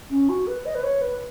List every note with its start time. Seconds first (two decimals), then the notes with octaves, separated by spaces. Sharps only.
0.11 C#4
0.29 F#4
0.47 B4
0.66 D#5
0.75 B4
0.83 C#5
1.01 B4